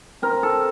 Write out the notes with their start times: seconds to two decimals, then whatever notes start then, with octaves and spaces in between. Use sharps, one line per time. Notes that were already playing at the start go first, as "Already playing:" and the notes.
0.22 C4 A#4
0.43 A4